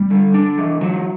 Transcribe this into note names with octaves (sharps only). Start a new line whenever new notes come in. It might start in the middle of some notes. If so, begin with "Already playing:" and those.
Already playing: G3
D3
D4
E3
F#3